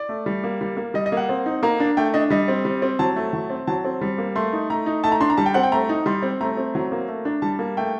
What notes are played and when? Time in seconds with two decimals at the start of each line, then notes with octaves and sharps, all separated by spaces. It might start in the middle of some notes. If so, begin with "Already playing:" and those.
Already playing: D5
0.09 A3
0.26 G3
0.44 A#3
0.61 G3
0.77 A#3
0.94 G3 D#5
1.06 D#5
1.12 A#3 F#5
1.29 C4
1.46 D#4
1.63 A#3 A#5
1.80 D4
1.97 A3 G5
2.14 D4 D#5
2.30 G3 D#5
2.48 C4
2.65 G3
2.82 C4
2.99 F#3 A5
3.16 A3
3.33 F#3
3.50 C4
3.67 F#3 A5
3.85 C4
4.01 G3
4.18 A#3
4.36 A3 C6
4.53 D#4
4.70 A3 A#5
4.86 D#4
5.04 A3 A5
5.12 A#5
5.20 D4 C6
5.30 A#5
5.37 G3 A5
5.46 G5
5.54 C4 F#5
5.63 G5
5.72 A3 A#5
5.89 D#4
6.06 G3 C6
6.23 C4
6.41 A3 A#5
6.57 C4
6.75 F#3
6.92 A#3
7.08 A3
7.25 D4
7.42 G3 A5
7.59 A#3
7.77 A3 G5